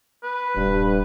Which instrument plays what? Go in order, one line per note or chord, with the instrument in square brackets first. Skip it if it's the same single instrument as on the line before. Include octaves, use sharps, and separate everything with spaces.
[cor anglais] B4
[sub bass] D#1 [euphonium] G2